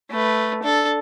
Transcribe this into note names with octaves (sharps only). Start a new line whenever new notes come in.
A3 B4
D4 A4